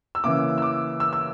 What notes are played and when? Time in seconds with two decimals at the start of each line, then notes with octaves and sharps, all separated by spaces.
0.15 E6
0.24 C#3 E3 A#3 D6
0.58 E6
0.62 D6
1.00 E6
1.13 E6